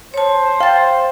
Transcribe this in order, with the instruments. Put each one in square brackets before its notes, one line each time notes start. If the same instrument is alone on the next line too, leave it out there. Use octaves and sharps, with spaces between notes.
[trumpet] C5 [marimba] C#5 A5
[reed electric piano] F5 [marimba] G5 A6